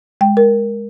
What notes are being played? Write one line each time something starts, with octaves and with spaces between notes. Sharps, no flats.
G#3 G5
A#4